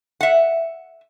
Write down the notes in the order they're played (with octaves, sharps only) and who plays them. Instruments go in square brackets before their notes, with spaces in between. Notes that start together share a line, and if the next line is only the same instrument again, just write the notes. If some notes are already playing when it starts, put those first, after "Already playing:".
[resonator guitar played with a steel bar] E5 F#5